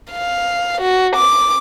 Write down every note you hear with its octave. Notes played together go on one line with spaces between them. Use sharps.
F5
F#4
D6